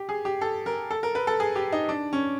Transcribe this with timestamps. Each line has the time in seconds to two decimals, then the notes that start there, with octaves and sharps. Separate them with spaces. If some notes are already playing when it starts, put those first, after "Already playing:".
Already playing: G4
0.09 G#4
0.25 G4
0.41 A4
0.66 A#4
0.91 A4
1.03 A#4
1.15 B4
1.27 A4
1.40 G#4
1.56 G4
1.73 D#4
1.89 D4
2.13 C#4